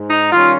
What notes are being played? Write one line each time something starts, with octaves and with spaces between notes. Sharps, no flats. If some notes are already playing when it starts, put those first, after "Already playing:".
Already playing: G#2
D#4
D#3 G3 C#4 F4